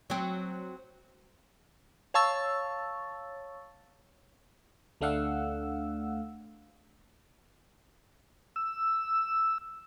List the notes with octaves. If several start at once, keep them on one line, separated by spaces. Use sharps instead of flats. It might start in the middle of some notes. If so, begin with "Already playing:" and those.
F#3 C4
C#5 F5 A5 C#6 E6 A6
D2 A3 D4 F5 F#5 E6
E6